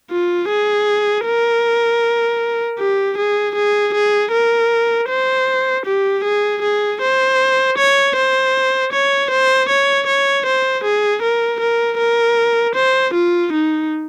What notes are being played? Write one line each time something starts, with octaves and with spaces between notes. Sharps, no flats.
F4
G#4
A#4
G4
G#4
G#4
G#4
A#4
C5
G4
G#4
G#4
C5
C#5
C5
C#5
C5
C#5
C#5
C5
G#4
A#4
A#4
A#4
C5
F4
D#4